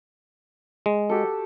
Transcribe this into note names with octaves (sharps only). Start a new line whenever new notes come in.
G#3
F#4 G4 A4